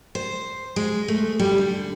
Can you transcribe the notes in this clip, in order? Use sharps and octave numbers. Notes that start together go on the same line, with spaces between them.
C5
G#3
A3
G3
D3